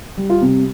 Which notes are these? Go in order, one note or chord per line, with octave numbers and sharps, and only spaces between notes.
G3
F4
C3